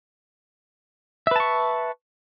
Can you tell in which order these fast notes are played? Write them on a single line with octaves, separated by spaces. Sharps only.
E5 B4 A5 C#6